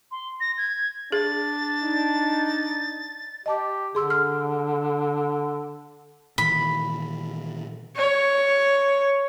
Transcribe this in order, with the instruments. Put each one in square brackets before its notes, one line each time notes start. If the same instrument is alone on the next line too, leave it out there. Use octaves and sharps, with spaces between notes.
[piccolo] C6
A#6
G#6
[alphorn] D4 [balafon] G#4 [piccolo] A6
[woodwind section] D#4
[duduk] G4 [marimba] D#5 A5 D6
[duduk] D3 [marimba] G#4 C6 E6
[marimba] F6
[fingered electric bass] A#2 D#3 E3 [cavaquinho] B5
[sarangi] C#5